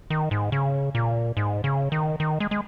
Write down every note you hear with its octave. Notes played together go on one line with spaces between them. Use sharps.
D#3
G#2
C#3
A#2
G#2
C#3
D#3
D#3
G#3
G#3